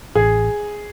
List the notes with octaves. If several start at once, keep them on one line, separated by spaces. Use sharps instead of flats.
A1 G#4